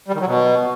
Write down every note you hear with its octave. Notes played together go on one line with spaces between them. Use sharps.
G3
D#3
F#3
B2